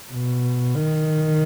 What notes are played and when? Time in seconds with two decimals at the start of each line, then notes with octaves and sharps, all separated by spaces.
0.12 B2
0.76 D#3